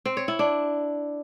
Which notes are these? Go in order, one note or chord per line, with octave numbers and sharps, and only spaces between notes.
C4
C#5
E4
D4